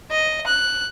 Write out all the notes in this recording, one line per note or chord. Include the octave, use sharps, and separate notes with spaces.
D#5
F#6